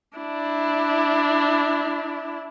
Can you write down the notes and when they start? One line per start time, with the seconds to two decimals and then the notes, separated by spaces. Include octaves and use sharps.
0.18 D4 E4